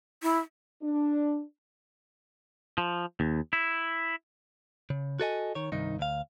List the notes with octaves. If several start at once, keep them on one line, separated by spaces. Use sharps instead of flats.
E4
D4
F3
D#2
E4
C#3
F#4 A4 D#5 G#5
D#3 C#5
C2 G2 D#3 D#4
D2 F5